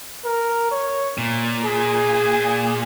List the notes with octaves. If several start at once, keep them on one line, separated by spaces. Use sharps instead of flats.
A#4
C#5
A#2
G#4